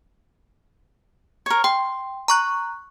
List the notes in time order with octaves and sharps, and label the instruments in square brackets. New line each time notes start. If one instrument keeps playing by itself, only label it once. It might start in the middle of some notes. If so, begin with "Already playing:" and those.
[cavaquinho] A#4 C#5
[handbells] G5 [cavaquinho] C6
[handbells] A#5 C#6 F#6